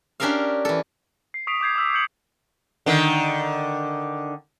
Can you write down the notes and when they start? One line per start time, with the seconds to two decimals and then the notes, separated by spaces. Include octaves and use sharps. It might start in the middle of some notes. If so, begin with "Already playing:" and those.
0.20 C#4 D4 G4 A#4 E5 F5
0.65 E3 A4
1.34 C7
1.47 C#6 D#6 B6 C7 D7 F7
1.60 D6 D#6 G6 G#6 C7
1.76 D6 E6 B6
1.93 D#6 G6 C#7 F#7
2.86 D3 D#3